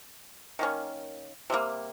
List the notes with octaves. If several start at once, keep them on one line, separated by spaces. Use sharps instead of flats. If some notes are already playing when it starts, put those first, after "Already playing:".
D#3 A#3 C#4
C3 G3 A#3